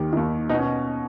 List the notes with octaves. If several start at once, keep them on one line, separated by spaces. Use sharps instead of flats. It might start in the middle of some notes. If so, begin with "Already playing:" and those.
Already playing: D#2 D#3 G4
D#2 D#3
B2 D#4
C#4